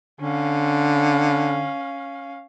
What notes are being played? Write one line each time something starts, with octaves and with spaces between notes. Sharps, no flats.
D3 C#4 F5